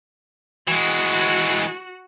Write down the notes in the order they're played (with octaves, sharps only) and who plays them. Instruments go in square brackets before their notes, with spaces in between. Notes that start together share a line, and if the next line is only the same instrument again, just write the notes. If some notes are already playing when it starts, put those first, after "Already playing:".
[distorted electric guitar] E3 G#3 [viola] F#4